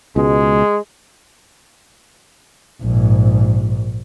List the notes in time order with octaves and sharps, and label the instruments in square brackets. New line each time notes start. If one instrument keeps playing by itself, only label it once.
[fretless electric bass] C#2 B2 [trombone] G#3
[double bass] A#1 G#2